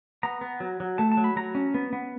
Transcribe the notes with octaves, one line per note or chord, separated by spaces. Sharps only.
B3 A#5
B3
F#3
F#3
A3 A5
A5
F#3
B5
F#3 A#5
C#4
B3
B3